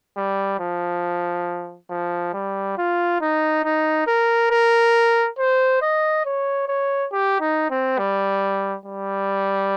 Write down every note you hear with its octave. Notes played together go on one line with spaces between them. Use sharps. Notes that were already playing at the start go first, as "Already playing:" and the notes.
G3
F3
F3
G3
F4
D#4
D#4
A#4
A#4
C5
D#5
C#5
C#5
G4
D#4
C4
G3
G3